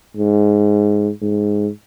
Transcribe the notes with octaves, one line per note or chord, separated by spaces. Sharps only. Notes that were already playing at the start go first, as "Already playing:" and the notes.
G#2
G#2